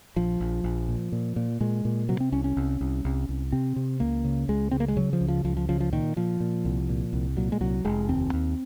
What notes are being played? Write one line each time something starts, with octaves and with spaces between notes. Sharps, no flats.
A#1 F3
A#1
A#1
A#2
A#2
A#2
A#2 G#3
A#2
C3 F#3
C4
C2 C#4
C#4
C2
C2
C2
C2
C3 C4
C3
C#2 A#3
C#3
C#2 G#3
C#3 C4
A#3
G#3
C#3 F#3
F3
C#2
F3
C#2 F3
F3
C#3 F3
F3
A#2 D#3
A#2 F3
A#2
C2
A#2
C2
A#2 F#3
G#3
C2 F#3
F1 G#3
D#2 C4
D#2